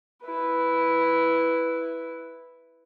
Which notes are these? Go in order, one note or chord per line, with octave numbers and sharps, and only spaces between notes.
E4 B4